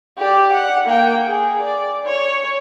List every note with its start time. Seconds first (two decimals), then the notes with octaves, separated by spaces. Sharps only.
0.17 G4 D5
0.52 F#5
0.85 A#3 G5
1.25 G#4
1.61 D5
2.05 C#5